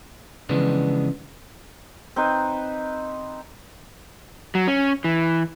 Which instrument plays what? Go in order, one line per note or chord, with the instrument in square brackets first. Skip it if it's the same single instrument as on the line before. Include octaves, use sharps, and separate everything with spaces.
[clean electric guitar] C#3 E3 F3 G#3 B3 D4
[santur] C4 D#4 B4
[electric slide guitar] F#3
C#4
E3